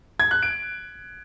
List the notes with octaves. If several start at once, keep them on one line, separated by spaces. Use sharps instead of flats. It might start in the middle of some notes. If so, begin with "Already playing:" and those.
G#6
F#6
D7